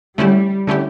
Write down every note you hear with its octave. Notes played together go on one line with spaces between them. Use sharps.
D3 G3 A3 C#4 E4 G4
D3 A3 C#4 E4 G4